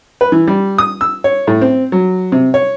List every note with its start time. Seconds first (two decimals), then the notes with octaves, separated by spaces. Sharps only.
0.21 B4
0.32 E3
0.48 G3
0.78 D#6
1.01 E6
1.24 C#5
1.47 A2
1.62 C4
1.92 F#3
2.32 C3
2.54 C#5